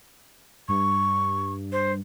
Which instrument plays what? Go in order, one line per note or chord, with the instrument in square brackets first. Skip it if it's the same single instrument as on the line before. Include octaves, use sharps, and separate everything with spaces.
[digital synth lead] G2 [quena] C#6
[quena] C5